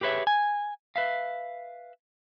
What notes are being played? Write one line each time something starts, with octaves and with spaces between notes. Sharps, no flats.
G4 G#4 B4 C#5 E5
G#5
B4 E5 F5